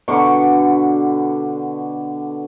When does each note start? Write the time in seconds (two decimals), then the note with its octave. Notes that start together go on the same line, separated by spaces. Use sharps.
0.08 B2 D3 C#6